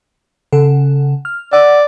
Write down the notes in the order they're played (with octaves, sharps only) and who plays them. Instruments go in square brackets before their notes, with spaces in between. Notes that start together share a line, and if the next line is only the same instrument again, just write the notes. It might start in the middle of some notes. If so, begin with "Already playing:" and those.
[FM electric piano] C#3 A4 F#5
F6
[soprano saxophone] D5 [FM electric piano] F#5 E6